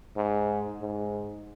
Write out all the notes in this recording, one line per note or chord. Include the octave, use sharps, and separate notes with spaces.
G#2
G#2